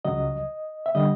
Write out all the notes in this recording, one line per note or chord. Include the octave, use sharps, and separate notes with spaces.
C#2 C#3 F#3 D#5
E5
D3 G3 D#5